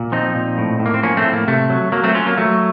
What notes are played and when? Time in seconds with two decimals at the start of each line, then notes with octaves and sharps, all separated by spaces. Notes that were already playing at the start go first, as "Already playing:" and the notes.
Already playing: A#2
0.12 F3 C4 D#4
0.35 A#2
0.58 A2
0.79 A2
0.86 A#3
0.94 C4
1.03 F3 A#3 C#4
1.17 A3 C4
1.25 A2
1.33 A#3
1.48 C3 A3
1.70 F#3
1.92 F#3 A#3
2.04 A3 C4
2.15 F#3 C#4 F4
2.26 A#3
2.38 F#3 A3